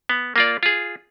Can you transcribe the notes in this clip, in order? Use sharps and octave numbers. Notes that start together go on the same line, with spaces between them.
B3
A#3 F4 D5
F4 G#4